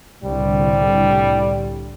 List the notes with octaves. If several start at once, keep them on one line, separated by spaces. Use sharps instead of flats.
C2 A2 D3 G3